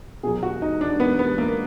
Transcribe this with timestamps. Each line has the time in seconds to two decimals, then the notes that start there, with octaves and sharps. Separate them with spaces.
0.23 B2 F#3 G#4
0.43 F#4
0.62 D#4
0.81 D4
1.00 B3
1.19 B3
1.38 A#3